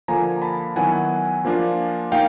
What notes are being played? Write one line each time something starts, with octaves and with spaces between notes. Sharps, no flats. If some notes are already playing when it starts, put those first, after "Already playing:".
D3 F3 A#3 D4 G#5 A#5
A5 B5
D#3 F#3 B3 E4 F#5 G#5
F3 A#3 D4 F4
A#3 D#4 F5 G5